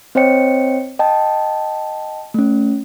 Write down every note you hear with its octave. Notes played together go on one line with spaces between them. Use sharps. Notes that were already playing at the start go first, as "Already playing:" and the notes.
C4 C5 C#5 D#5 G5 C#7
D#5 G5 A5
A3 C#4